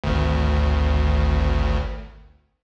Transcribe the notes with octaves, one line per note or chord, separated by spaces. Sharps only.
G#1 D2